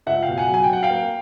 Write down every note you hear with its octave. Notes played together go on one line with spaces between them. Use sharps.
C#2 E5 F#5
F5 G5
B2
F#5 G#5
F#3
G#5
G5
F#3 F#5
F5 G5
A#3